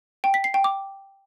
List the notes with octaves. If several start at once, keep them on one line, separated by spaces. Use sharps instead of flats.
G5
B6
C7
G5
D6